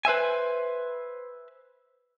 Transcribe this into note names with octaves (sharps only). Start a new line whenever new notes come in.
B4 C5 E5 G#5